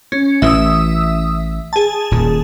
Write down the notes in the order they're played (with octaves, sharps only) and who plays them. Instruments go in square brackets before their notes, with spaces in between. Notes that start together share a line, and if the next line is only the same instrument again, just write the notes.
[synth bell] C#4
[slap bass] A1 E3 [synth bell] E5 D#6 E6
[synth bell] G#4 A5
[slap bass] D#1 A#2